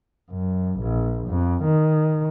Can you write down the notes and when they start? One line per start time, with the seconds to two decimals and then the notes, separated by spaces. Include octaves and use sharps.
0.31 F#2
0.80 A#1
1.28 F2
1.64 D#3